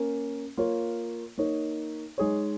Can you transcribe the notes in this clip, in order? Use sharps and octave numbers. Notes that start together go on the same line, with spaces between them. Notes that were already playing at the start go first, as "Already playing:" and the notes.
Already playing: A#3 C#4 A#4
A#3 F4 C#5
A#3 D#4 C#5
G#3 D#4 G#4 C#5